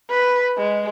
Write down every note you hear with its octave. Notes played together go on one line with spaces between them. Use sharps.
B4
G#3